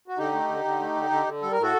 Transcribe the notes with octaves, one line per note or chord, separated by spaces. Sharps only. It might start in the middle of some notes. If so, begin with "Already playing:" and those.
F#4
D3 D#4 G4
A3
D3
D3
A3
D3
D3
D3
G3 A4
A#4
A2
F#4 A4